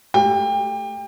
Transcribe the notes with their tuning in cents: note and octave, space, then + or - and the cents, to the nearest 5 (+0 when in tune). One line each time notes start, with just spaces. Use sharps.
A3 +0 G4 +0 G5 +30